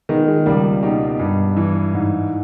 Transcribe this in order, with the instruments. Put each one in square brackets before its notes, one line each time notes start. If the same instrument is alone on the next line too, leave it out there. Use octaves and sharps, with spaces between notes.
[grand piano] D#3 G#3 B3
G#3
C#2 G3 A#3
B2 D#4 G4
G2
E3
G#2